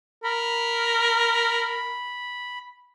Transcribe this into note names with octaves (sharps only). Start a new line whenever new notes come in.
A#4 B5